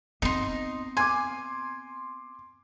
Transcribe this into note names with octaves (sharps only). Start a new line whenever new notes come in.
B3 C4 D#4 C6
G#5 C6 D6